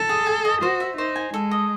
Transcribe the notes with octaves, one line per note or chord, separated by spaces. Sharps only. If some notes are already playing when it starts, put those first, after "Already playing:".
Already playing: A4
G#4
G#5
D#5
F#4 C5
E5
D#4 C5
G#5
G#3 A4
D#5